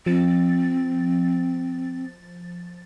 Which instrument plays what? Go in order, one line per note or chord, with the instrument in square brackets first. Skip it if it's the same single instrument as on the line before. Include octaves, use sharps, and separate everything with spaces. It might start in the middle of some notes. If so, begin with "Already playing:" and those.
[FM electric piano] F3 A6 [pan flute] C4